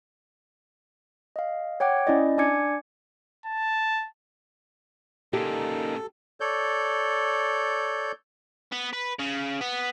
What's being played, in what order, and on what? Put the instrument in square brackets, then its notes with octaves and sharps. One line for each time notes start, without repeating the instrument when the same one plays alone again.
[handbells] D#5 F5
C#5 F#5 G5 D6 G#6
C#4 E4 D5 D#5
D4 D5 G#5 D6 G#6 C#7
[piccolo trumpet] A5
[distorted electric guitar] A#2 C#3 [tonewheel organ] D#4 A#4 [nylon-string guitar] G4 [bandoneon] A4
[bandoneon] A4 C#5 D5 G6
[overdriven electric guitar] B3
B4
C#3
B3